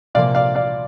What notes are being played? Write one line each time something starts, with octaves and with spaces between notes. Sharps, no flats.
C2 A#2 F3 A#3 D5 F5
D5 F5
D5 F5